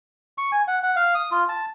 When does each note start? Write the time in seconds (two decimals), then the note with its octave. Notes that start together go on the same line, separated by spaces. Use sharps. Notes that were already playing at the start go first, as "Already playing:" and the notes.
0.38 C#6
0.52 G#5
0.68 F#5
0.83 F#5
0.96 F5
1.15 D#6
1.31 F4
1.49 A5